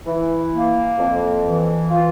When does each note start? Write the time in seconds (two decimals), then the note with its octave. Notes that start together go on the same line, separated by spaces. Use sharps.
0.06 E3
0.53 A#3
0.99 F2
1.44 E3
1.91 F4